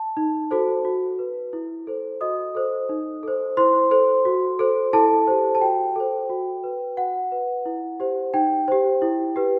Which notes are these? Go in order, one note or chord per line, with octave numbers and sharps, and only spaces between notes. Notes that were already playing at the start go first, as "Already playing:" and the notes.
Already playing: A5
D#4
F#4 A4 C5
F#4
B4
E4
A4 C5
F#4 D#5 D#6
A4 C5
D#4
A4 C5
E4 C5 C6
A4 C5
F#4
A4 C5
E4 A4 A5
G4 C5
A5
F#4 G5
A4 C5
F#4
B4
F#4 F#5
B4
E4
G4 C5
D#4 G5
G4 C5
E4
G4 B4